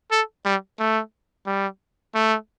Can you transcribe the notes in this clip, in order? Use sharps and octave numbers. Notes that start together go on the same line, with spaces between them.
A4
G3
A3
G3
A3